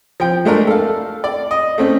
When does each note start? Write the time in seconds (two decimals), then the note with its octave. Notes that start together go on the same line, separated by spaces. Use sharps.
0.20 F3 G5
0.45 G#3 A3 D4 A#4
0.67 A4 F5
1.24 D5
1.51 D#5
1.78 A3 C4 C#4